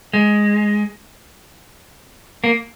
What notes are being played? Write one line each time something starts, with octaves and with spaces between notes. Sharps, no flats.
G#3
A#3